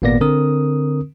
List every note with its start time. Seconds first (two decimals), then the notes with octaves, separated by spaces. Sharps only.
0.02 G#1 A#2 A#3 B3 D5 A#6
0.21 D3 C4 A#4 D#6